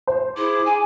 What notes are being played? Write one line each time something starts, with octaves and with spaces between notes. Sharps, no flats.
C5
E4 G#4 D6
G#5